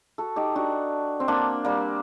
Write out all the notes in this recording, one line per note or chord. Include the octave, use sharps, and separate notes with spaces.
F#4 A4
D#4 G4
D4 F#4
C4
A#3 D4
G3 A#3